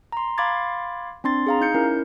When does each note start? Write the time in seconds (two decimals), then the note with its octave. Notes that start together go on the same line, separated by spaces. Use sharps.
0.12 A#5 C6
0.38 F5 B5 C6 D6 G#6 A6
1.24 C4 D4 C6 A6
1.47 G#4 F5 A#5
1.61 D#4 G6 C#7
1.75 C#4 E4 A#4